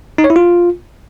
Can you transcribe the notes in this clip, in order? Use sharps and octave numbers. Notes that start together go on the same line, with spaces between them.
D#4
C#5
E4
F4